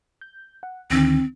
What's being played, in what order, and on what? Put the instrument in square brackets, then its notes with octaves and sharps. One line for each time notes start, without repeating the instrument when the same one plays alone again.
[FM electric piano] G6
F#5
[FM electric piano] D2 D3 D#3 [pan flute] C4